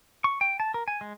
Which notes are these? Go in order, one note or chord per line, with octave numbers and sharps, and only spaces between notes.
C#6
G5
A5
A#4
G#5
G#3